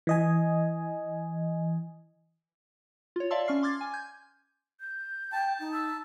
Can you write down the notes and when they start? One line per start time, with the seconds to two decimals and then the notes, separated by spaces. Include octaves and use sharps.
0.07 E3 D#5 G#5
3.16 F4 C#5
3.31 D5 E5 F5 A5 C6 E6
3.47 C#4 C#6 F6 C7
3.63 C6 D6 F6 G#6 A6
3.81 G#5
3.93 G6 G#6
4.80 G6
5.32 G5 A5
5.60 D#4
5.73 E6